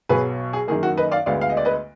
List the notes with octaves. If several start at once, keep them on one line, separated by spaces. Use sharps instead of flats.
B1 B2 F#3 G#4 B4
G#4
F#2 D#3 A#3 G#4
F#4
B4 D#5
D5 F5
D2 D3 G#3 B3 D5 F5
F5
D#5
D5
B4 D#5